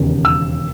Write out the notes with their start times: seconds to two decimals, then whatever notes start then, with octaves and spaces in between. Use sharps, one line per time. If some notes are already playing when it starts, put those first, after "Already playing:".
Already playing: E1 D#2 C#3
0.25 E6